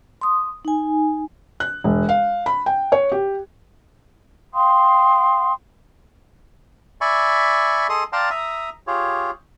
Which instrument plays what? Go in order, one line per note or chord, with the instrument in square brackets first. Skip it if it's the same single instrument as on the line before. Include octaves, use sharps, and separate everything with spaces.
[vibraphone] C6 D#6
D#4 G#5
[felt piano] F#6
E1
F5
B5
G5
C#5
G4
[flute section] F5 G5 C6 D#6
[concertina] D5 E5 G#5 B5 C#6
G#4 A4 D#5 C6 D#6
D5 F5 G5 A5 A#5 C6
E5 A#5 D#6
F4 G4 G#4 C#5